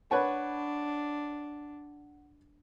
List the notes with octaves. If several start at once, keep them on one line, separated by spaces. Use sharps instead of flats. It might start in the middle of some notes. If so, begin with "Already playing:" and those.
D4 B4 C#5 F#5 A5